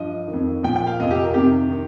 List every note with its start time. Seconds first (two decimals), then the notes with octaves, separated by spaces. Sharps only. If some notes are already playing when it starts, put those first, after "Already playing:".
Already playing: G2 F3 D#5
0.28 D#3
0.33 F2
0.63 A#2 F3 G5
0.76 G5
0.87 F5
1.00 F2 C3 F3 D#5
1.11 G4
1.23 A#4
1.34 F2 C3 D#3 G4
1.70 D#3